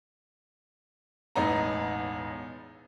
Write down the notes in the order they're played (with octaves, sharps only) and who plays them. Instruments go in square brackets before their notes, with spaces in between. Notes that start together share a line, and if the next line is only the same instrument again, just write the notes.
[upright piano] E1 A1 B3 D#4 A#5